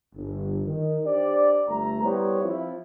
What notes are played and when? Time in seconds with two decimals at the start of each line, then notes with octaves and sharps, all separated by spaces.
0.15 G1
0.66 D#3
1.05 D4 G4 C5 D5
1.68 G1 A3 A#5
2.02 G3 B3 E4 C5 C#5
2.44 F3 C4 E4